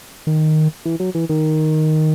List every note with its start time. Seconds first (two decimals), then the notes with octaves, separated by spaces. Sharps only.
0.27 D#3
0.85 E3
1.00 F#3
1.15 E3
1.29 D#3